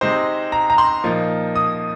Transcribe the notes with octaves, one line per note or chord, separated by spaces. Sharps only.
C3 G#3 C4 D#4 C5
A#5
A#5
C6
A#2 F3 A#3 D#4
D#6